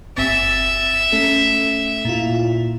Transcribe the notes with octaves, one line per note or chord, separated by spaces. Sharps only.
G1 C4 E5 A6
A3 C#4 A4
A#2 E4 F4